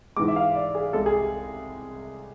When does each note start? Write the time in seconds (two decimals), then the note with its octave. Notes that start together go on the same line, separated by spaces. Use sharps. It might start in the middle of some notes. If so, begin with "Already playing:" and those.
0.17 G#2 E3 G#3 D6
0.28 E5
0.36 F5
0.55 D5
0.75 G#4
0.93 C2 C3 G#3 A4
1.06 G#4